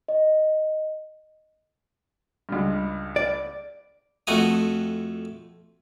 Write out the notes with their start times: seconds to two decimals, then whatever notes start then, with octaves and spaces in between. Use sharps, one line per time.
0.08 D#5
2.49 C#2 G2
3.16 D5
4.27 F2 A3 F#4 D#6